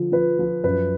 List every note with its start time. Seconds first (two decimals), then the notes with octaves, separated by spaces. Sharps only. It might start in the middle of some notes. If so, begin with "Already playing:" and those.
Already playing: D3 F3
0.12 F3 B4
0.39 F3
0.64 F#2 B4